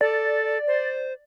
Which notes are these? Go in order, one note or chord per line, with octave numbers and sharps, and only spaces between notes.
A4 D5
C5